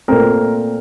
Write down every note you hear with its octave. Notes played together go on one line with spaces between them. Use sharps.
A#2 A3 C4 A#4